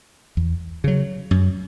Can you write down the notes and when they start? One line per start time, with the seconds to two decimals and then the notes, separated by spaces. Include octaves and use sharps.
0.37 E2
0.84 C#3 F#3
1.31 F#2